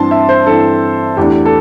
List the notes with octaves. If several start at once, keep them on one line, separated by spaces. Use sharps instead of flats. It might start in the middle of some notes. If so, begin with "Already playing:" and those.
Already playing: G2 E3 C4 A5 C6
E5
C5
G2 E3 C4 A4
E2 E3 A3 D4 G4
A4